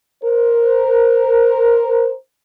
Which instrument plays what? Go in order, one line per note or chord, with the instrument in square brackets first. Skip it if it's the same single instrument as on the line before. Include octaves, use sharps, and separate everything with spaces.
[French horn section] A#4 C5